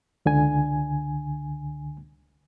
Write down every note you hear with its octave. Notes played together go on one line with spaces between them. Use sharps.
C#2 D3 G#5